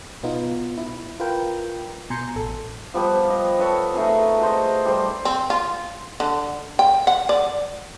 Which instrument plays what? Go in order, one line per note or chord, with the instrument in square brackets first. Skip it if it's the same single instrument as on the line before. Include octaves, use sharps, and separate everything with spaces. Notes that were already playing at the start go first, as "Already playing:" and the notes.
[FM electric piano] B2 B3 D#4 F4
E4
F4 A#4 B4 G5
B2 G#5 A#5 C6 G6 C#7
A1 A4
[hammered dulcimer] F3 G3 B3
D#5
A4 B4 C#5
A3 D#4 G#4 G#5
F#4 A4 C5 D#5
G3 A4 C5 D5
[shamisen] C4
F4
D3
G5
F#5
D5